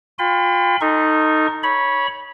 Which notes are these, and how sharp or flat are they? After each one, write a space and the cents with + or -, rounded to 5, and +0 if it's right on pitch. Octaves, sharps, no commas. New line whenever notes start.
F4 +30 G5 +40 B5 +40
D#4 +0 A4 +25 C#6 -40
C#5 +0 B5 -20